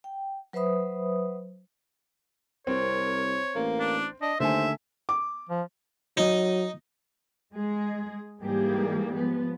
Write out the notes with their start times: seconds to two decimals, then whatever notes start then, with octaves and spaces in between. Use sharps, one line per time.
0.04 G5
0.53 F#3 B4 C5 E5 B5 D#6
2.67 C2 C4 A#4 C#5
3.55 A1 A#3
3.79 D4
4.22 D4 D#5
4.40 D#2 D3 A3 C5 E5 G#5
5.09 D6
5.49 F3
6.17 F#3 D#4
7.54 G#3 G#4
8.41 G#2 E3 G3 A#3 G4 G#4
9.14 F3 B3